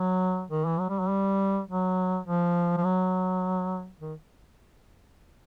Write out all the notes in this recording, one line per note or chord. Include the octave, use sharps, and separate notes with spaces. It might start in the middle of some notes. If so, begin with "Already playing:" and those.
Already playing: F#3
D#3
E3
F#3
G3
F#3
G3
F#3
F3
F3
F#3
D#3